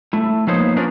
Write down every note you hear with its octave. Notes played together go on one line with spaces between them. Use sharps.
A3 E4
F3 A#3 B3 D#4 C5 C#5
C#4 D4 F4 A#4 B4 D5